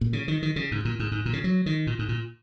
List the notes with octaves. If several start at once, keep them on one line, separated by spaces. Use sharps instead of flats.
A#2
C#3
D#3
D#3
C#3
G#2
A#2
G#2
G#2
A#2
C#3
F#3
D#3
A#2
G#2
A#2